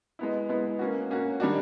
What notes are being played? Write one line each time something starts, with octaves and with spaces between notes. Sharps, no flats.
G#3 B3 E4
G#3 B3 E4
A#3 C#4 F#4
A#3 C#4 F#4
D#3 G3 A#3 D4 F#4